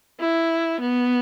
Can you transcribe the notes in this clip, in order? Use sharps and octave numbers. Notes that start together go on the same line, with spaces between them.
E4
B3